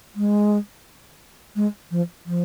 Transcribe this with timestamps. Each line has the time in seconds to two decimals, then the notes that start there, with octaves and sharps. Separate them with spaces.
0.16 G#3
1.56 G#3
1.91 F3
2.26 F3